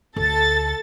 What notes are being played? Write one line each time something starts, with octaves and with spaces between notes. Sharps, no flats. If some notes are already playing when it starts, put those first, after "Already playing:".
D2 A4 A6